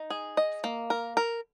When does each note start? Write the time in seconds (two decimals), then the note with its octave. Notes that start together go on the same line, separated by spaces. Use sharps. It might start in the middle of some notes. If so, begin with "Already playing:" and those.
Already playing: D#4
0.10 G#4
0.37 D#5
0.64 A#3
0.90 A#4
1.17 A#4